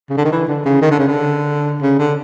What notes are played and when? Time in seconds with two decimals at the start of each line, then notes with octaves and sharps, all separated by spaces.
0.10 C#3
0.17 D3
0.25 D#3
0.32 E3
0.48 D3
0.65 C#3
0.82 D#3
0.91 D3
0.99 C#3
1.07 D3
1.82 C#3
1.99 D3